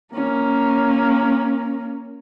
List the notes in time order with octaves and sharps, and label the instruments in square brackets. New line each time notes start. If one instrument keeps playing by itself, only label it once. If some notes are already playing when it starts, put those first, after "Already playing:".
[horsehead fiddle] A#3 C#4